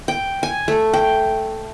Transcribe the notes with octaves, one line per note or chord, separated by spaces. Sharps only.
G5
G#5
A3
G5